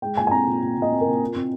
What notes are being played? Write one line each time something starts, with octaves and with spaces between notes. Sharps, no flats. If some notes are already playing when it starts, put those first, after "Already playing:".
G#3 G5
A#2 G#5
G#5
C4 A#5
A#2
A#2
A#2
D#5
C4
A#4
A#2
F4
C4